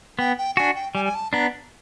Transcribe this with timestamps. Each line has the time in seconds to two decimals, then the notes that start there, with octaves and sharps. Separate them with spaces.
0.19 B3 G5
0.38 G5
0.57 D4 F#4 G#5
0.75 G5
0.95 G3 G#5
1.05 G#5
1.15 A5
1.33 B3 D4 A#5